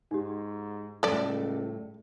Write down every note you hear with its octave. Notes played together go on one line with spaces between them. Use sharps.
G#2 D#4 G4
C#2 A2 G3 A4 D5 E5